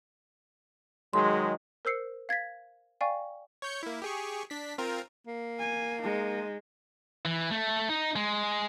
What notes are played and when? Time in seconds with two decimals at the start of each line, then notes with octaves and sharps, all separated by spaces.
1.13 D#3 F#3 G#3 C6
1.85 A#4 C5 E6 C7 C#7
2.29 F5 G#6 A6 B6
3.01 D5 F5 G5 G#5 C#6
3.62 C#5 G6 C#7
3.83 A#3 E4
4.02 G4 G#4 C#6
4.50 D4 B6
4.78 C4 F4 A#4
5.27 A#3
5.59 G#5
6.02 G#3 D#4
7.25 E3
7.51 A3
7.89 D#4
8.16 G#3